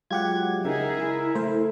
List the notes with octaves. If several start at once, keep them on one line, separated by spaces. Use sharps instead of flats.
F#3 G#3 F4 G4 F#5 G#6
C#3 D#4 G#4 A#4 E5
E4
A3 C5